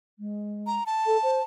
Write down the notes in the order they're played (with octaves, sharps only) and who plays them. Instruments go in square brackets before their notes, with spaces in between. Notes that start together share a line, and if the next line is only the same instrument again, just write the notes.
[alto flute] G#3
[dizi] A#5
A5
[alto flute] A4
C5